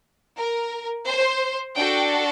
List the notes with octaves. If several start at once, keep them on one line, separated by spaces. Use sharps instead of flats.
A#4
C5
D4 F#4 A4 G5